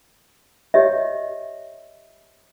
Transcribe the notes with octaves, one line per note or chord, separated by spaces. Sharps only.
G4 C#5 D#5 E5